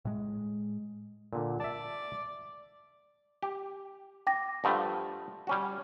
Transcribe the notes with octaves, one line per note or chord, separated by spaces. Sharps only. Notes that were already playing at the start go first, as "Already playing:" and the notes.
A2 G#3
A#2 D3
D5 E5 A5
G4
G5 D6 A#6
G2 F3 A3 F#5 A5 B5
G3 C#4 F#4